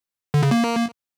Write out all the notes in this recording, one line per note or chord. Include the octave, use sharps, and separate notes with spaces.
D3
C#3
A#3